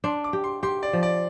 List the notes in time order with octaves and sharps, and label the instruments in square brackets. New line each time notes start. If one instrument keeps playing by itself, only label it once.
[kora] D4 [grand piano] C6
[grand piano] D6
[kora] G4
[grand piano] C6
[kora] G4 [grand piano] C6
[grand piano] D5
[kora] F3
[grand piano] D5